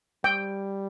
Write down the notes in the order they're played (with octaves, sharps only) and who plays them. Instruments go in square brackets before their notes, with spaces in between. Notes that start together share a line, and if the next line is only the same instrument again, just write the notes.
[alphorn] G3 [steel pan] G5